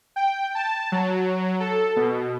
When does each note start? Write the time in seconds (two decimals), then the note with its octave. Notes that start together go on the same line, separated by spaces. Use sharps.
0.16 G5
0.55 A5
0.92 F#3
1.60 A4
1.96 B2